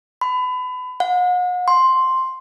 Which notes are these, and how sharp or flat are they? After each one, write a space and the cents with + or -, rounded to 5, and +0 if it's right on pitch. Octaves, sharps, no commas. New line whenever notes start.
B5 +30
F#5 -40
C6 +5